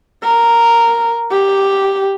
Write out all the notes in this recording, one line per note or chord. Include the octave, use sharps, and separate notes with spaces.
A#4
G4